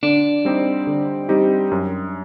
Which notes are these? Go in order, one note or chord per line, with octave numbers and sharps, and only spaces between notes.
D3 D4
G3 C4 D#4 G4
D3
G3 C4 D#4 G4
F#2